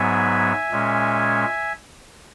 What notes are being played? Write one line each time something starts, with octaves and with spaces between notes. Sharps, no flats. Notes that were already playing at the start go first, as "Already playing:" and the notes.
Already playing: G#2 F#3 B3 E5 G#5
A#2 G#3 C#4